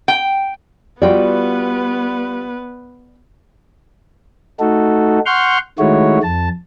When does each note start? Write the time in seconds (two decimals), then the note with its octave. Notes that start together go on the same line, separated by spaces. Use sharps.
0.08 G5
1.02 G3 B3 F4 F#4 B4 D5 G5
4.60 A3 D#4 F#4 A4
5.26 F#5 C6 C#6 F6 G6
5.79 D#3 G#3 A3 E4 F#4 C#5
6.23 F2 A5